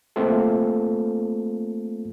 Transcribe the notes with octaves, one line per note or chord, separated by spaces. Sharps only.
A3 A#3 C4 F4 A4